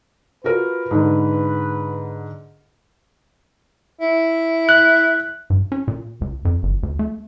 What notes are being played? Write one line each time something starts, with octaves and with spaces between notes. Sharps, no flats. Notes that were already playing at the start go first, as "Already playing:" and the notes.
F4 F#4 A#4 B4
G#2 D3
E4
F#6
G2
C#4
A#2
C#2
F2
G1
D2
A3